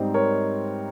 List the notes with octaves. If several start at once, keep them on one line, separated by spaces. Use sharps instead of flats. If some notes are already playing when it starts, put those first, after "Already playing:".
Already playing: G#2 G3 C4 D#4
A#4 C#5